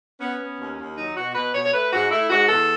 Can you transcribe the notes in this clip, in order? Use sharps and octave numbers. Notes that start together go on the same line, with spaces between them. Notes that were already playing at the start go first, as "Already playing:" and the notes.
B3 C#4
B3
D#2
D#2
F#3 D#4
B2 F#4
B2 B4
B2 C#5
C#5
A3 B4
G#2 F#4
A3 E4
G#2 F#4
E2 A4